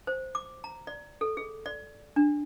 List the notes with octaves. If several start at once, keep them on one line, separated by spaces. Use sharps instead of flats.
C5
D6
A#5
D5
A4
G#4
D5
D4